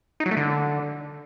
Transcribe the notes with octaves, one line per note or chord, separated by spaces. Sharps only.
D#4
F#3
A3
D3